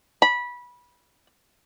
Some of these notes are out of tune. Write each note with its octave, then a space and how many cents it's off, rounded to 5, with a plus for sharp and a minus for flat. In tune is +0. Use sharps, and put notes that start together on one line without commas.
B5 -20